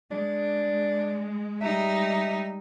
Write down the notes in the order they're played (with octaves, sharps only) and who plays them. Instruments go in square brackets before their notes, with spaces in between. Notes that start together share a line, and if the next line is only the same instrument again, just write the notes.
[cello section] G#3 [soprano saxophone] D4
[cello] G3 D#4 [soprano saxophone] E5